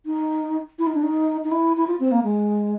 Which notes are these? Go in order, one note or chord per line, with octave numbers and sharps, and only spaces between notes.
D#4
E4
D#4
D4
D#4
D#4
E4
E4
F4
C4
A#3
G#3